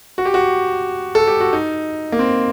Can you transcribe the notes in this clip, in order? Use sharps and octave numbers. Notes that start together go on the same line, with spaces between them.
F#4
G4
F#4
A4
G4
F#4
D#4
A#3
C4